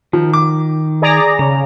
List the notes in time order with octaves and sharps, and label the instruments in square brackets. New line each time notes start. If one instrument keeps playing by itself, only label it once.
[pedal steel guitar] D#3 [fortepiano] F3
[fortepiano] D6
[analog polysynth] G#4 D5 A#5
[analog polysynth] C#3 [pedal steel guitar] A#5